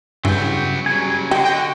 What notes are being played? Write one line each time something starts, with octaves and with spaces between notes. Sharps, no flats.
G2 C#3 E3 F#3 B3 G5
C#3 F#3 G3 G#5
D3 F#4 G4 D#5
G5